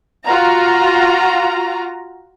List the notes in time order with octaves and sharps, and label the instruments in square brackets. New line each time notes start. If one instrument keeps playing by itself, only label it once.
[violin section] F4 F#4 A#5